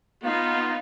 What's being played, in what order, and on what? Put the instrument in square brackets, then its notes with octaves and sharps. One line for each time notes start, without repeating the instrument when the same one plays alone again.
[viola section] B3 D#4 [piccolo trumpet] F4 [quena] F5